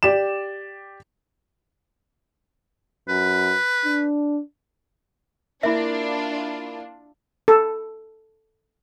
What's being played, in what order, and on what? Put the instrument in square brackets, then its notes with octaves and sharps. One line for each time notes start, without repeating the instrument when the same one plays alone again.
[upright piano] G4 D5 E7
[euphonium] F#2 [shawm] B4
[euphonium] D4
[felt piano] A#3 E4 [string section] D4 F4 [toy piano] E5
[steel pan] A4